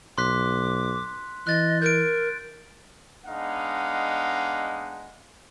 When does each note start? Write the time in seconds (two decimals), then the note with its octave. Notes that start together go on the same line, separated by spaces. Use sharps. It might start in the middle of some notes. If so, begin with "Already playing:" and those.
0.18 B1 C6 D6 F#6 B6
1.47 E3 D#5 F#6 A6
1.82 A#4 G6 D7
3.26 G#3 B3 D4 D#4 F5 F#5